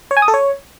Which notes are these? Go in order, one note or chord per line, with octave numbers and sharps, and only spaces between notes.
C#5
G#5
D#6
A4
C#5